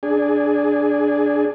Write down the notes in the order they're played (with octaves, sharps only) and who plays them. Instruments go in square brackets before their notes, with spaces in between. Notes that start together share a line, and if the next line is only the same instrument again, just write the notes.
[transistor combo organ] D4 G#4